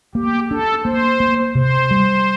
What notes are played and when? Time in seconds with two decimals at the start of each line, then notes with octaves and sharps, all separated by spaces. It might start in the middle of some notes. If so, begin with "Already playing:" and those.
0.15 A#3 G4
0.50 D4 A4
0.85 A#3 C5
1.20 A#3
1.55 C3 C5
1.91 G3